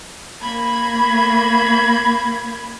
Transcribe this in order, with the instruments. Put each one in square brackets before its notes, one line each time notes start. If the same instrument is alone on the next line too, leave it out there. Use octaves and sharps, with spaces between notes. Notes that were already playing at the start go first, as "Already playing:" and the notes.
[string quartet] A#3 B5 G#6